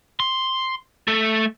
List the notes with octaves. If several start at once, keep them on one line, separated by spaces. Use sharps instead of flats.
C6
A3 A4